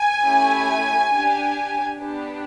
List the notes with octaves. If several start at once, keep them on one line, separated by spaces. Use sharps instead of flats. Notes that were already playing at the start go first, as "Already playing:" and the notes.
Already playing: G#5
A3 C#4 E4 G4
D4 G4
B3 D4 G4